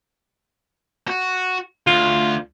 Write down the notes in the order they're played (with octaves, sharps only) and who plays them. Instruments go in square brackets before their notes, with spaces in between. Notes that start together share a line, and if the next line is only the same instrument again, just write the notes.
[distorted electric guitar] F#4
[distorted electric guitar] D2 [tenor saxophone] F4